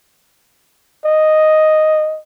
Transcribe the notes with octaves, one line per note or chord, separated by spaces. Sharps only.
D#5